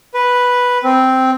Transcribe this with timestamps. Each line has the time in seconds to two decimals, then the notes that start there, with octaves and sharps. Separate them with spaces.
0.14 B4
0.84 C4